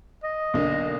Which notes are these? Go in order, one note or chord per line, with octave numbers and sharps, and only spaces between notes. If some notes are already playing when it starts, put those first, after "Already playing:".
D#5
B1 D3 A#3